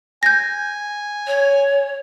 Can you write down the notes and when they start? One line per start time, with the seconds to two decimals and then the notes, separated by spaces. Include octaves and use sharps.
0.23 G#5 G6 A#6
1.27 C#5